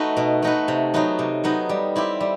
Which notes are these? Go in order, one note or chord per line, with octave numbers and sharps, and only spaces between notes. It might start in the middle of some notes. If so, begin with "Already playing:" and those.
Already playing: A3 D#4 F#4 B4
B2
A3 D#4 F#4 B4
C3
F#3 B3 D#4
C3
F#3 B3 D#4
G3
C4 E4 G4
G3